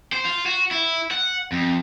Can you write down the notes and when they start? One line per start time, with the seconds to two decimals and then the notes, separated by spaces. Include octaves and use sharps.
0.13 C5
0.25 F4
0.46 F#4
0.71 E4
1.11 F#5
1.52 F2